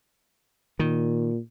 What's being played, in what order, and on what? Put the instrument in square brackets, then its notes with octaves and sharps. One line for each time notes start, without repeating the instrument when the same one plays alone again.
[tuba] A#2 [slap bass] D#3